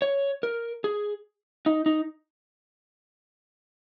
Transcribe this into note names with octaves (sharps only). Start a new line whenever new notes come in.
C#5
A#4
G#4
D#4
D#4